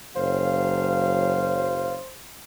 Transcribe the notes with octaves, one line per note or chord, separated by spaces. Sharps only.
F#1 F#3 C5 F5